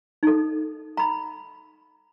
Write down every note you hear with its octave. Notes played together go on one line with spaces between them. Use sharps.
D#4 A4
A#5 B5